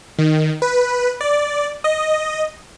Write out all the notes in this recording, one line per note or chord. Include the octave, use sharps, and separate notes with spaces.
D#3
B4
D5
D#5